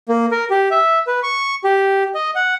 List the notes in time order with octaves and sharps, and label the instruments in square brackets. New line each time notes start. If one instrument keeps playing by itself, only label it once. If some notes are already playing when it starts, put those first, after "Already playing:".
[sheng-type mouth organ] A#3
A#4
G4
E5
B4
C#6
G4
D#5
F#5